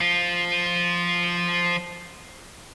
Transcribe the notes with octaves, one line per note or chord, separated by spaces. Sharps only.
F3 F4